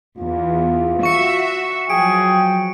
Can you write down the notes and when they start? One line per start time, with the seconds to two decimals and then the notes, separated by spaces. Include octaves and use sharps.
0.18 E2 F4
1.03 F#4 E5 C#6 C#7
1.90 F3 F#3 G#4 G5 D7